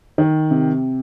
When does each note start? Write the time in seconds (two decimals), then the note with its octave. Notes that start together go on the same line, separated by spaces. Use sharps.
0.18 D#3
0.51 C3